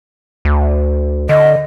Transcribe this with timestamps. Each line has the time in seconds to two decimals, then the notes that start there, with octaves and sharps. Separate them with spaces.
0.45 D2
1.29 D3 D#5